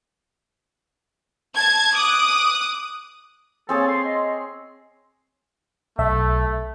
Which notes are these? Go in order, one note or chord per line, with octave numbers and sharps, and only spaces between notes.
A5 G#6
D6 D#6 F#6
A#3 C4 G#4 A4 C#5
C6
D#5 C6
B1 A3 E5